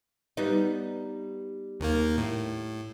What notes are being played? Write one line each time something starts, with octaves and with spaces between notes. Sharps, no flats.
G3 B3 D#4
D#2 D#3 A#3
A2